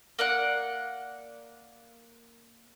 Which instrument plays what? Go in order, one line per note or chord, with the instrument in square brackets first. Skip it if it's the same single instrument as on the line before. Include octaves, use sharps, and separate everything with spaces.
[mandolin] A#3 D5 F#5